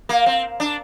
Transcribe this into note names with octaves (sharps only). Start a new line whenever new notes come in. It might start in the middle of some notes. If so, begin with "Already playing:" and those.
A#3
C4
D4